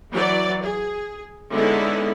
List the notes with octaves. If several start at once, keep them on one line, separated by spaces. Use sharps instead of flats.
E3 F#3 D5
G#4
D3 G#3 B3 C#4 D#4 E4